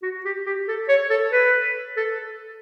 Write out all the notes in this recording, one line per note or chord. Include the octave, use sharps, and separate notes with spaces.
F#4
G4
G4
A4
C#5
A4
B4
A4